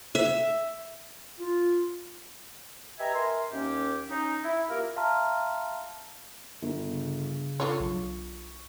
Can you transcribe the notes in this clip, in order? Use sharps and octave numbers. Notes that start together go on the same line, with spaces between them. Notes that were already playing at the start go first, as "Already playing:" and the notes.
E5
F4
G4 B4 D#5 E5 G#5 A#5
A#4 E5 G#5 C6
D#2 C#4 G4
C#4 D#4
E4
A#3 F4 G4 A#4
E5 F5 A5 A#5 C6 F6
G1
C#3
D3 F4 C#5 C#6
B1